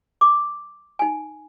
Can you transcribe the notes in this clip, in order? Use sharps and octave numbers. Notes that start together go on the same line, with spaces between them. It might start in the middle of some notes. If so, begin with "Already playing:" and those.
D6
D#4 G#5